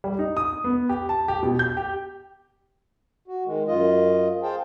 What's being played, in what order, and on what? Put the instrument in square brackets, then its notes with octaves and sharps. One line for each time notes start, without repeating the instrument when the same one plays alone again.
[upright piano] G3
D#4
D#6
B3
G4
A5
G4
B2
G6
G4
[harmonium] F#4
D#3 G#3
F#2 F4 D#5
G#4 C5 F5 G5 A5